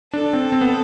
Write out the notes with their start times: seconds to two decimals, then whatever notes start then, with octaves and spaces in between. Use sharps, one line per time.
0.13 D4 A4
0.33 C4
0.52 C4
0.61 B3